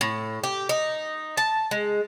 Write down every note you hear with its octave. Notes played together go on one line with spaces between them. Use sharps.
A2
G4
D#4
A5
G#3